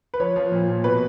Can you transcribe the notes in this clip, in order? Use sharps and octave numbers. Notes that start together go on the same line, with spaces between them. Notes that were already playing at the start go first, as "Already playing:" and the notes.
B4
F3 C#5
F3
A#2
A#2
B2 B4